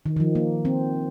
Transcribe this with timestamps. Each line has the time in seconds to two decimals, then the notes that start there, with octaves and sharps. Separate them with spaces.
0.06 D#3
0.17 D#3
0.20 F3
0.35 A#3
0.65 C4